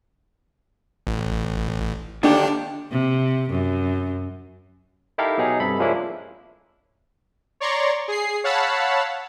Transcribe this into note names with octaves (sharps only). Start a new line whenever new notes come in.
A1
D#2 D3 D4 G4
C3
F#2
D#4 E4 G4 A4 A#4 F5
B2 F#3 D#4 G#4
G2 C3 A4 B5
F3 G#3 A#3 C#4 D4 E4
C#5 D5 A#5 C6 C#6
G#4 C7
C#5 F5 F#5 A5 B5 E6